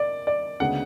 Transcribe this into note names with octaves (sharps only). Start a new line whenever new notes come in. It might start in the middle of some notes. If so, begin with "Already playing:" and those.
Already playing: D5
D5
D2 C#3 G#3 B3 D4 F#5